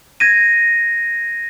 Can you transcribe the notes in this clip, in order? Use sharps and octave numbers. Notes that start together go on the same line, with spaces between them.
G#6 A#6 D#7